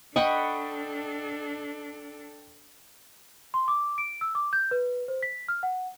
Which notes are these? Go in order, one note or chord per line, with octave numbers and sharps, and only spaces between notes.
D4 A4 D#5 F#5 G5 B5 C#6
C6
D6
D7
E6
D6
G6
B4
C5
B6
F6
F#5